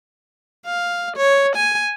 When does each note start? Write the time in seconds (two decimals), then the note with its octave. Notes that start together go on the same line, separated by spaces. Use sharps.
0.66 F5
1.17 C#5
1.56 G#5